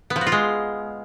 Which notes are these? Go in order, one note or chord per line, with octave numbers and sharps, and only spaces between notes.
B3
F3
F#4
F4
G#3